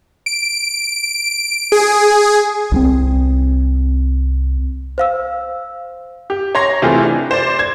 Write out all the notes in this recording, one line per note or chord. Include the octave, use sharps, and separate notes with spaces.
D7
G#4
C2 F3 C4
C5 F5 E6
G4
C#5 A#5 C6 A#6
C3 E3 A3 F4 G4 G#4
D4
C5 D5
G#6